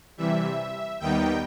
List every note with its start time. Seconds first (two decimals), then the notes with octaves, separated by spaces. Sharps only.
0.17 C3 E3 G3 E5
1.00 D#2 D#3 G3 B3 D#4 G5